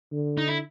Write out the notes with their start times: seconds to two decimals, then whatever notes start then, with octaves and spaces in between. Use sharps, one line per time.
0.12 D3
0.38 D#4
0.48 E4